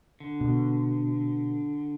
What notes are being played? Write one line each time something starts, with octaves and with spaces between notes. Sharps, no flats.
D3
B2